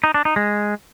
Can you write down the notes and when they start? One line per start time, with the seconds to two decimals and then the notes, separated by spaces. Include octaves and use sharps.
0.04 D#4
0.14 D4
0.25 D#4
0.36 G#3